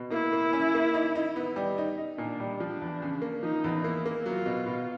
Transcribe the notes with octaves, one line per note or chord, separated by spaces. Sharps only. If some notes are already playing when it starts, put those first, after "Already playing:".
Already playing: B2
A#3 E4
A#3
C#4
A#3
D#4
D#4
B3
G3
D#4
D#4
A#2 D4
G3
F3 D4
E2
C#3
A#3
F3 D#4
E2
A#3 E4
A#3
F#3 F4
B2
B2